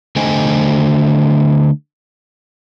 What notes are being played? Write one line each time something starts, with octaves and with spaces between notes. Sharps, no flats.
D3 A3 C5 D#5 G5 G#5